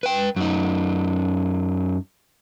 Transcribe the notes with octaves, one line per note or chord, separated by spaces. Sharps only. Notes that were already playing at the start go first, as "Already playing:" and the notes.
B4 G5
F#2 D#4